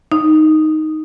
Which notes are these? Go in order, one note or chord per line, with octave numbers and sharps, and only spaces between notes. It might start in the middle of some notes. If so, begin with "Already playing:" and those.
D#4